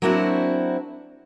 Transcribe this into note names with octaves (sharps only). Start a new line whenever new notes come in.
F#3 A#3 C4 D4 E4 F#4